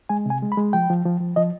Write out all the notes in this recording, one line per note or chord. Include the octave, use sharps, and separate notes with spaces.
G#3 G#5
C3 G#5
G#3
B5
G#3
F3 G5
F3
F3
F3
F3 D#5